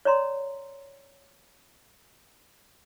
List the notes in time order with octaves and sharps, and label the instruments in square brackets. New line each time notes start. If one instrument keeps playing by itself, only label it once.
[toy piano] C#5 D5 A#5 C6